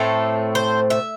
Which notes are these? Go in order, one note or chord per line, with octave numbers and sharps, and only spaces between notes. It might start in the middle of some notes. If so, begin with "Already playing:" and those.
Already playing: A2 A3 C4 A4
C5
E5